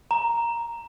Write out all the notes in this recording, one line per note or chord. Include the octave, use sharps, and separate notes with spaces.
A#5